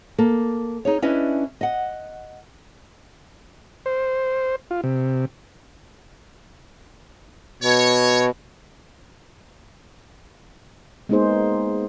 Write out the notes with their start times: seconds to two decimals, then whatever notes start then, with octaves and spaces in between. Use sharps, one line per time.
0.18 A#3 A4
0.85 D#4 G#4 C#5
1.02 C#4 D4 E4 B4 D5 D#5
1.61 D#5 F#5
3.86 C5
4.71 F4
4.84 C3
7.63 B2 C#5
11.09 G#3 A#3 B3 D#4 G#4 C5